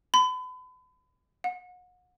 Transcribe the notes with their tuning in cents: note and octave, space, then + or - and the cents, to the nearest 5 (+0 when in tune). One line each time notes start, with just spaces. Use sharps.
B5 +35
F#5 -35